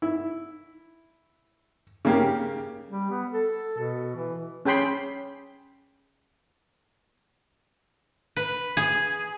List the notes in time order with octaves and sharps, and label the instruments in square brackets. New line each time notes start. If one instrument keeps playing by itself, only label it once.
[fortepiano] E4
C#3 A#3 G4
[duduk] G3
B3
A4
B2
E3
[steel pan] C#4 G#4 G5 B5 C6
[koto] B4
G#4